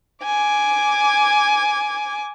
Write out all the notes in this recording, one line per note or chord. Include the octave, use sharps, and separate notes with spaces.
G#5 D6